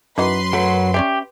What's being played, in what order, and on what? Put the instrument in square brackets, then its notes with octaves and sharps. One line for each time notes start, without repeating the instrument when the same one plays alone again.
[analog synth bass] F#2 [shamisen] E3 D#4 F#4 [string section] B4 C6
[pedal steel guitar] F#3 [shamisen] A3
[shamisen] C#4 D5 E5 [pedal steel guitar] G4